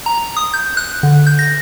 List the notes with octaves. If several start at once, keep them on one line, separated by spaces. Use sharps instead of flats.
A#5
D#6
G6
F#6
D3
G6
A#6